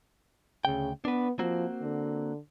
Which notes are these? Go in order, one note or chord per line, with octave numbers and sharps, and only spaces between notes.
D2 C#3 G5
B3 D4 B4
F3 A#3 C4 F#4
D3